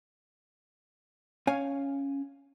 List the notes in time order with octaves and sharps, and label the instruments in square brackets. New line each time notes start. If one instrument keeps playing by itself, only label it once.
[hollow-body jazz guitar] C#4 C#5 F5 G#5